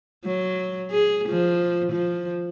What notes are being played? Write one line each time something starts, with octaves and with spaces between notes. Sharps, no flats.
F#3
G#4
F3
F3